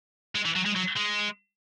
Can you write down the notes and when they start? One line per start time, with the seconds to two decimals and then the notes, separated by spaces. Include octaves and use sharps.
0.35 G#3
0.45 E3
0.56 F#3
0.66 G#3
0.76 F#3
0.96 G#3